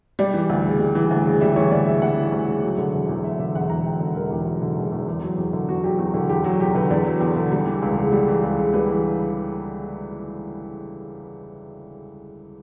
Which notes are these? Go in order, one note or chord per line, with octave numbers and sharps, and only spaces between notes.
G3 D5
E3
D2
C#3
G3
E3
D2
C#3
G3 E5
E3 C#5
D2 D5
C#3 E5
G3 F#5
E3
D2
C#3
F#3
D3
E1
E2
F#3 E5
D3 E5
E1 F#5
E2 A#5
F#3 G5
D3
E1 A#4
E2 G4
F#3
D3
E1
E2
E2
F#3
E2
D3
E2 F#4
F#3 G4
E2 F#4
D3 G4
E2 G4
F#3 F#4
E2 G4
D3 B4
E2 D5
F#3
E2
D3
G3
E3
C#2
C#3
G3
E3
C#2
C#3
G3 B4
E3